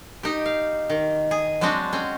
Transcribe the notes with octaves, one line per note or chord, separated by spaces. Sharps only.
D#4 G4
F5
D#3
G#4
F#3 G#3 C4 D4 F#4
C4 C#4